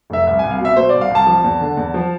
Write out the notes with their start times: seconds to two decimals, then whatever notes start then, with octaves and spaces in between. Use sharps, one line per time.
0.10 F1 E5
0.27 C2 E5
0.39 C2 G#5
0.51 F5
0.60 B2
0.65 E5
0.76 B2 C5
0.89 C2 D5
1.01 F5
1.11 C2 A5
1.27 F3
1.44 E2
1.61 D3
1.77 E2
1.94 F3